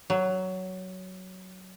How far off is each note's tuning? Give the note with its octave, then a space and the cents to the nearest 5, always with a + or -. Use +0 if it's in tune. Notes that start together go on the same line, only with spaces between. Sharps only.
F#3 +10